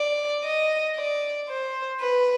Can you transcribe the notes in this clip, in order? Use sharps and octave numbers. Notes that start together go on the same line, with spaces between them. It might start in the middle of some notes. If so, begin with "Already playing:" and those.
Already playing: D5
D#5
D5
C5
B4